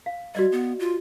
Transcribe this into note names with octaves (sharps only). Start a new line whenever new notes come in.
F5
G3 F#4 D5 D#5
B3
F4